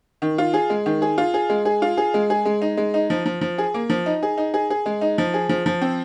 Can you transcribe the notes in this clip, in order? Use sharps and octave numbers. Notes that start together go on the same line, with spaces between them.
D#3
F4
G#4
G#3
D#3
G#4
F4
G#4
G#3
G#4
F4
G#4
G#3
G#4
G#3
D#4
G#3
D#4
F3
F3
F3
G#4
A#3
F3
D#4
G#4
D#4
G#4
G#4
G#3
D#4
F3
G#4
F3
F3
C4